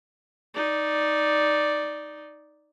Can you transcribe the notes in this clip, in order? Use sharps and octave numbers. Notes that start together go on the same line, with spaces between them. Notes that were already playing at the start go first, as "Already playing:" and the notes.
D#4 D5